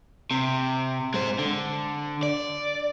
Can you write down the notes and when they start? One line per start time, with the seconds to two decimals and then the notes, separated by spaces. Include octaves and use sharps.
0.31 C3
1.14 G#3 C5
1.39 D3
2.23 D5